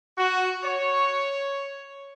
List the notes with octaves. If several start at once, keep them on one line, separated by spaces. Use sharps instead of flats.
F#4
C#5